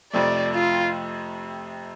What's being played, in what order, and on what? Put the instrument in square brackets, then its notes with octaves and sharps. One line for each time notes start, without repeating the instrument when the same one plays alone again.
[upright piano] F2 C3 F3 A3 [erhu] D5
[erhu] F4